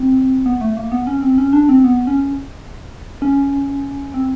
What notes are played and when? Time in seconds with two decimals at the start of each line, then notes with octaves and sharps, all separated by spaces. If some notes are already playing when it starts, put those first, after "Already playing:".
Already playing: C4
0.46 B3
0.61 A3
0.77 A#3
0.92 B3
1.07 C#4
1.22 C4
1.38 C#4
1.53 D4
1.69 C4
1.84 B3
2.07 C#4
3.22 C#4
4.14 C4